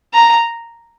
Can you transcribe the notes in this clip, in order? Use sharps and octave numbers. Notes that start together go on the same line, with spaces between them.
A#5